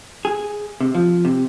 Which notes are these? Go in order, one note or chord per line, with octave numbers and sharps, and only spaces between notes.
G#4
C3
F3
C3